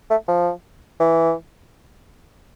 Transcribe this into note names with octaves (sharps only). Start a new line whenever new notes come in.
A3
F3
E3